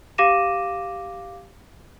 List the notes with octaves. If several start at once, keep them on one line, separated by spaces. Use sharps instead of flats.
G4 F5 D6 A#6 D#7 E7